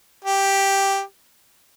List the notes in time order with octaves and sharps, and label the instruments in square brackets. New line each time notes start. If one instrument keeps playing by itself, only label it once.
[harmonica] G4